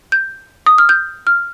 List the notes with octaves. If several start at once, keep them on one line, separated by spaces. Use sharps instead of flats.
G6
D#6
F6
G6
F6